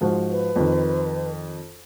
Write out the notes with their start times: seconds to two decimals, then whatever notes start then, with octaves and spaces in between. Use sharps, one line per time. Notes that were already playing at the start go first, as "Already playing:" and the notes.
0.01 G#2 F3 F#4
0.31 B4
0.56 F2 D#3